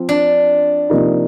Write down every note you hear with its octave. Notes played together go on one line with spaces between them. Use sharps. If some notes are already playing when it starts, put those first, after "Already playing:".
Already playing: F3 C4
D4
C3 F3 A#3 D#4